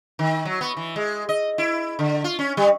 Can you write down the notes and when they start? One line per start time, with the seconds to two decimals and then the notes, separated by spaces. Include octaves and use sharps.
0.19 D#3
0.45 F#3
0.61 B3
0.77 E3
0.96 G#3
1.29 D#5
1.58 E4
1.99 D3
2.24 F4
2.39 C#4
2.57 G3